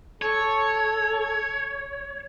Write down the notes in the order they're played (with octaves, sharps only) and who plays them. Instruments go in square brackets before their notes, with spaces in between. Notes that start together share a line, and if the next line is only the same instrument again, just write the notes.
[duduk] A4 [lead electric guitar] C#5